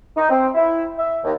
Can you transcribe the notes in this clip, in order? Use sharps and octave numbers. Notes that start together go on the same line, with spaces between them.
D#4
C4
E4
E5
D#2